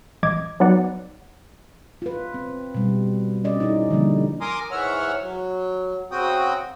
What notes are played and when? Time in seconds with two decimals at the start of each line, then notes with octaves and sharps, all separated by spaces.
0.23 A1 D#5 D6 G#6
0.60 F#3 B3 D#4 D5 F#5
2.02 F4 B4
2.34 C4
2.74 B2 G3
3.44 C#4 D5 D#5
3.60 D#4 E4 G#4
3.90 D3 F3 G3 A#3
4.41 A#4 G#5 A#5 C6 D6 D#6
4.71 G#2 E3 C#5 E5 F#5 F6
5.22 F#3
6.11 C#3 C4 F#4 G5 D#6